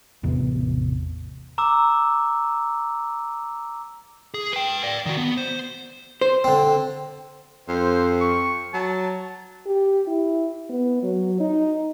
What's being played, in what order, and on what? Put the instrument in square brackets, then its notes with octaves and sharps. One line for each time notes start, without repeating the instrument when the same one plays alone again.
[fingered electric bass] A1 E2 C3 B3
[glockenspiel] A#5 D6 E6
[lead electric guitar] G#4
B4 G5
D5 F5
D#3 F#4
B3
C5
[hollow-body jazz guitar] C5
[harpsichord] D3 C4
[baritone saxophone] F2 [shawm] C5
[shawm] C#6
[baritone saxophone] F#3 [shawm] A5
[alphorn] G4
E4
B3
F#3
D#4